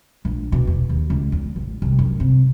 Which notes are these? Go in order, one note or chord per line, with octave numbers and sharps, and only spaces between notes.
A#1
B2
E2
D#2
C#2
E2
A1
C2
F#2
C3